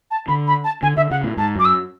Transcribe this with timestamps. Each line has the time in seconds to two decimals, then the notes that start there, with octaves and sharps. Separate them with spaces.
0.11 A5
0.28 D3 B5
0.47 B5
0.64 A5
0.82 D3 G#5
0.97 D3 E5
1.11 C#3 F#5
1.23 A2
1.37 G#2 A5
1.56 F#2 D6
1.65 E6